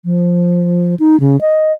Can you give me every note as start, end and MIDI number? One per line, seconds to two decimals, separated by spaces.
0.05 0.95 53
1.00 1.19 63
1.20 1.39 49
1.41 1.72 75